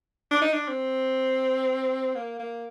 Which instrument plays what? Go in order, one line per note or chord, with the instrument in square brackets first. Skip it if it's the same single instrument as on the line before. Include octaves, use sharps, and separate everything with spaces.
[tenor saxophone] D4
D#4
D4
C4
A#3
A#3